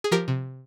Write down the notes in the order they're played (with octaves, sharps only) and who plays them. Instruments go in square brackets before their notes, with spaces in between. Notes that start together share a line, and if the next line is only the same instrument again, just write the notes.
[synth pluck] G#4
F3 G4 A#4
C3